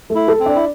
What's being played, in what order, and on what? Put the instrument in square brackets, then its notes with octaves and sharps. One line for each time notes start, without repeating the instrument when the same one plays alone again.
[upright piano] A3
[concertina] E4
[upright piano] A4
[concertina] C4
[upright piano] D4
[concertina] E4